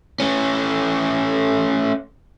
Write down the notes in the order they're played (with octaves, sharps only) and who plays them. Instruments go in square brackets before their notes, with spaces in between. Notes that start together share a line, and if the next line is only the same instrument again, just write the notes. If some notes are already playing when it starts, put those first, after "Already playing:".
[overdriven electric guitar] A3 C#4